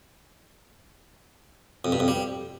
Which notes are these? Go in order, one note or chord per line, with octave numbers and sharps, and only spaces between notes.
F2
G2
F2
G3